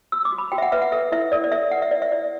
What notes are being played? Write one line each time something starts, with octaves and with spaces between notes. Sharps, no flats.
F#4 E6
D6
F#4
B5
F#4 G5
E5
F#5
B4 E5
F#5
A4 E5
E4 E5
A4 D5
D5
A4 E5
B4 F#5
E5
E4 D5
E5
E4 D5